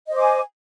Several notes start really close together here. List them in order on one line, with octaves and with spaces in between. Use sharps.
D#5 C5 D6 G#5